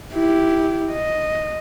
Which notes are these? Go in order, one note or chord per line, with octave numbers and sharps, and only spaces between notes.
E4 G4
D#5